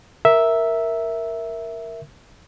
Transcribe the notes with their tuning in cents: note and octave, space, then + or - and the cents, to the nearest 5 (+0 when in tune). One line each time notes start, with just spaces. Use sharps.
A#4 +0 E5 -5